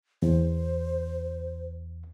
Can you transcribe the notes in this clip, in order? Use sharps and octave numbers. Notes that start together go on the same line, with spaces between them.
E2 C5